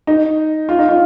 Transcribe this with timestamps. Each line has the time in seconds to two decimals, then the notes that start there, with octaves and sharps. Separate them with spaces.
0.07 D#4
0.69 F4
0.79 D#4
0.89 F4